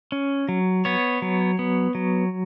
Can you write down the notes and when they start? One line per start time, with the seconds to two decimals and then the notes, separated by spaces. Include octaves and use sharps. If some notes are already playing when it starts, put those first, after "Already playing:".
0.12 C#4
0.49 F#3
0.85 B3 C#5
1.22 F#3
1.59 B3
1.95 F#3